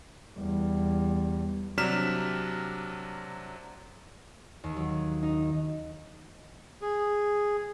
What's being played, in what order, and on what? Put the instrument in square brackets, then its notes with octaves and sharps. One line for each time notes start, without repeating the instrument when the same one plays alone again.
[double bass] E2 G3
[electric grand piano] C3 F#3 D4 F6 B6 E7
[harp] D#2
F#3
D#4
[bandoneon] G#4